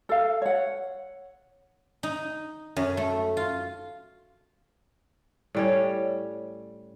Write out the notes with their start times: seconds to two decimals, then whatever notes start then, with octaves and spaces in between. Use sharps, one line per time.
0.09 A4 F5
0.42 C#5 F#5
2.03 D#4
2.76 F#2
2.97 A3
3.37 F4
5.55 A2 G3 C#4